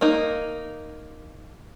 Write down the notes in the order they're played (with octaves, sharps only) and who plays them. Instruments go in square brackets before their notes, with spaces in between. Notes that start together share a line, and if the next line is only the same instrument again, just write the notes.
[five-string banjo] A#3 D#4